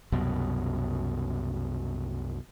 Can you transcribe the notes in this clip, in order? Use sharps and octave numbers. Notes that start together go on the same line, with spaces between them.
C2 F#2 B2